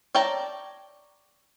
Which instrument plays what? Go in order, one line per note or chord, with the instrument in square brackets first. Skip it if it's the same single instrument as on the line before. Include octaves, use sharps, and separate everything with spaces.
[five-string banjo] C#5 D5 G5 A5 A#5